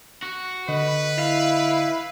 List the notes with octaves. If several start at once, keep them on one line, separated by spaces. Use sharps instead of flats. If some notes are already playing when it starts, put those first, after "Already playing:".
F#4
D3 B4 D#5
E4 F5